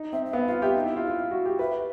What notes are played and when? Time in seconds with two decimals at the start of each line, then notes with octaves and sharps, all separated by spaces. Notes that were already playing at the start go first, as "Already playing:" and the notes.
Already playing: D#4
0.13 C4 E5
0.26 E5
0.33 B3 F5
0.48 F4 F5
0.62 G4 E5
0.75 D#4
0.86 E4
0.96 F4
1.07 F4
1.31 F#4
1.46 G4
1.59 B4 E5